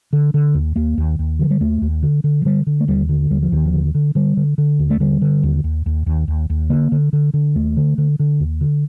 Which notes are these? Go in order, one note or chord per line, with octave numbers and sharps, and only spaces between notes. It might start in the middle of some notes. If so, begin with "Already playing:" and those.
D3
D3
D#2
D#2 A#3
D#2
D#2
D3 F3
G3
D#2 A3
D#2
D3
D3
F3
D3 G3
D3
A3
D#2 G3
D3
D#2 G3
F3
D#2 D#3
F3
D3
D3
D3 G3
D3
D3
D#2
A3
D3 G3
D3
D#2
D#2
D#2
D#2
D#2
D#2
D3 A#3
D3
D3
D3
D#2 A3
D3
D3
D3
D#2
D3